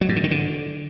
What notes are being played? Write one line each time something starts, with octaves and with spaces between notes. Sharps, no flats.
F#3
G#2
D3
D#3
D3